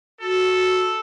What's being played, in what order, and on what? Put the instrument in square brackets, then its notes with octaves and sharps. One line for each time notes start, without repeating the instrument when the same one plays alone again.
[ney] F#4 [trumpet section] A4